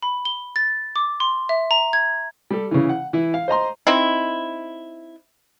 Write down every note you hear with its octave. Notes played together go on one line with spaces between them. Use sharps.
B5
G7
A6
D6
C6
E5
A#5
G#6
G3 G4 A4
C#3 E3
F#5
E3 E4
F5
C5 D#5 A#5 C6
C4 D#4 E4